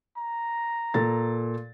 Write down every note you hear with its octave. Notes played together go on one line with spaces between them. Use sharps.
A#5
A#2 A4 A6